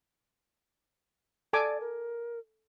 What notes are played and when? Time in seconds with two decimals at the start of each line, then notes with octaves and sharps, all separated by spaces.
1.53 A4 D5 G#5 D6
1.80 A#4